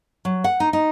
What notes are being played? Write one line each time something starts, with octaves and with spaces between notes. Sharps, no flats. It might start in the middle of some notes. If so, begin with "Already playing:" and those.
F#3
F#5
D#4
D#4